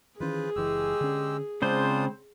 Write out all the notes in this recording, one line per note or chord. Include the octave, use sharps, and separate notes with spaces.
D#3 E3 C#4 F4 G#4 B4 C5
F#1 E3 G#3 G4 E6
D3 C#4
C#3 G#3 C4 D4 F4 C5 D#6